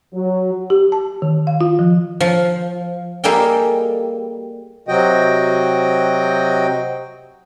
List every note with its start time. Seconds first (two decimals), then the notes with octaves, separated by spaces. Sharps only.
0.14 F#3
0.70 G4
0.92 A5
1.22 D#3
1.47 F5
1.61 F4
1.79 F3
2.20 F3
3.24 G3 A#3 G#4 A4 D#5 G5
4.88 C3 F#3 F#4 D#5 G5